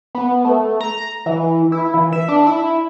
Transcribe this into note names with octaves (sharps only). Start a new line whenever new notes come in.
B3
A3
A#5
E3
E4
E3
E5
D4
E4